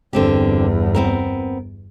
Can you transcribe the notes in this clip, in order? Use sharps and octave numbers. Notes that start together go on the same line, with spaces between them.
G1 E2 D3 C4 G4
B3 C4 A#4